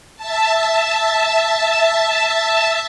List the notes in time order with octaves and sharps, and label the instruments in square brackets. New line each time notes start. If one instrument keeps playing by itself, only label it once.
[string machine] E5 A5